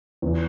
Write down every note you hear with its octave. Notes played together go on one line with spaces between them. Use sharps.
E2